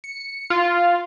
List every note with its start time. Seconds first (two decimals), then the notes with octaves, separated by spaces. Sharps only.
0.04 C#7
0.50 F4